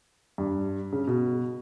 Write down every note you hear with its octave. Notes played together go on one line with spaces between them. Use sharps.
G2
C#3
B2